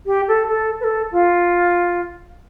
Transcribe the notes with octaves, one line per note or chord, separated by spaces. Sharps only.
G4
A4
A4
B4
A4
F4